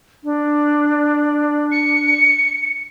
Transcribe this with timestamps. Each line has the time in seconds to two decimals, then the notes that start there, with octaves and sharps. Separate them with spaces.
0.24 D4
1.71 C#7